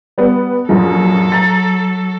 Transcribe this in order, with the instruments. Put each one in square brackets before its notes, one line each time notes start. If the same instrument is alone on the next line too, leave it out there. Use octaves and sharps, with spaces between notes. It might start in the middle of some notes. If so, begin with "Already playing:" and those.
[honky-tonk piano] G3 B3
[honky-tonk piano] A#1 F#2 [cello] F#3 A4
[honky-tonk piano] A#5 A6